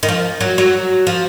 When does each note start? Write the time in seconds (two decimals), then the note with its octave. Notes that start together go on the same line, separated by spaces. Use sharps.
0.03 D#3
0.08 F3
0.40 F#3
0.58 F#3
1.07 F3